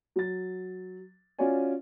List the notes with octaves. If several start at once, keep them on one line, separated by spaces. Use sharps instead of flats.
F#3 A6
C#4 F4 F#4 C#5 D5 G#5